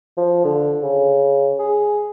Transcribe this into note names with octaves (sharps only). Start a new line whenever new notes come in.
F3
D3
C#3
G#4